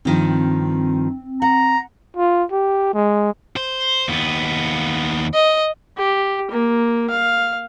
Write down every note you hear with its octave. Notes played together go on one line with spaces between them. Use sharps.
G2 D#3 F3 C4
F#5 A#5
F4
G4
G#3
C5
D#2 B3
D#5
G4
A#3
F5